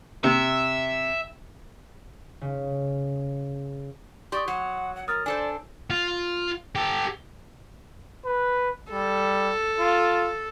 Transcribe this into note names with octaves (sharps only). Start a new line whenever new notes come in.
C3 E5
C#3
G4 D5 C6 C#6 D#6
F#3 F#5
F#5
A#4 D#6 F6 A6
D4 A4 C5 D5 G#5
F4
G4 A4
B4
G3 A4
F4